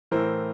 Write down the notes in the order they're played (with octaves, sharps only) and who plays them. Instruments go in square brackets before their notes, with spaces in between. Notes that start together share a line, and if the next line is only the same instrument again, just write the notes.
[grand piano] A2 E3 A#4 C5